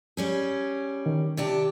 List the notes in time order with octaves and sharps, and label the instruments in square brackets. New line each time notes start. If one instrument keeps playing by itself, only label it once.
[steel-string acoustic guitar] G3 C#4 G#4
[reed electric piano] D#3
[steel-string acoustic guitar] C3 D4 G4